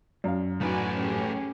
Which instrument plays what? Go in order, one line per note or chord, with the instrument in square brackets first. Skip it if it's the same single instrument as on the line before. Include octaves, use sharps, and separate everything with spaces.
[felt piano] F#2 [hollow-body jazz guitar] D5 F5
[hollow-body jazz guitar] A2 F#3 D#4 [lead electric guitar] A3 B4 [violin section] F#4 D5 G#5
[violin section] C#4 G4 G#4